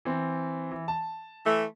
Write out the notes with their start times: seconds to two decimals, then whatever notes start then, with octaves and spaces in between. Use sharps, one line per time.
0.05 E3 C4
0.71 E3
0.88 A5
1.46 E3 A3